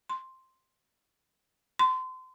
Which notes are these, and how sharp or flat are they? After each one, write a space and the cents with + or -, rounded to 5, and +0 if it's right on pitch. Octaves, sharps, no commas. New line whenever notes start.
C6 +0
C6 -30